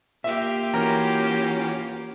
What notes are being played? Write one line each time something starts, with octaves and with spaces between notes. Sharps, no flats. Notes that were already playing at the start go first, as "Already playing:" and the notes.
A#3 F4 G4 E5
E3 C#4 F#4 A#4 A#5